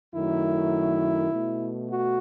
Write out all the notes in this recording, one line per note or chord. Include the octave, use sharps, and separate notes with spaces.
F#2 D#3 F#3 A3 E4
B2 A3
F#4